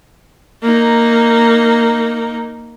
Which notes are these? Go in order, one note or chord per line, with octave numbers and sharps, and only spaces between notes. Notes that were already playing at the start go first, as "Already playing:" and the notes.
A#3 D#4